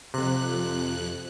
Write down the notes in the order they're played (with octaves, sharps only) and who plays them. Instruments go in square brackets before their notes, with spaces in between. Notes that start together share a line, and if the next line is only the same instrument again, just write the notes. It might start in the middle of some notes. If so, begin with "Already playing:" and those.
[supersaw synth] F2 F#6 [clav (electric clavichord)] C3